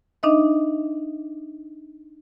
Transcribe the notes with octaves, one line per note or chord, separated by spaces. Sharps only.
D4 D#4 D#5 E5